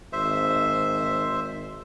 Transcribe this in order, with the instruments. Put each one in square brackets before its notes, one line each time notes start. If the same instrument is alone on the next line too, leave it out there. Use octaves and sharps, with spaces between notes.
[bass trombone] G#1 [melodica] C5 E5